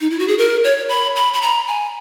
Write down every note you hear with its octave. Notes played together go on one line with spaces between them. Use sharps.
D#4
E4
F#4
G#4
A#4
C#5
B5
B5
B5
A#5
G#5